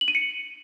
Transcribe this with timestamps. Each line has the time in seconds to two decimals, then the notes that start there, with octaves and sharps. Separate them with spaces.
0.01 F#7
0.08 D#7
0.15 C#7